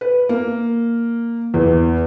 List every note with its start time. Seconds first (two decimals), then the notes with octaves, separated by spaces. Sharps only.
0.01 B4
0.29 A#3
1.54 E2